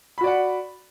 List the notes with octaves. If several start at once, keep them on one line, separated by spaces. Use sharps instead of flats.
F#4 D5 F#5 B5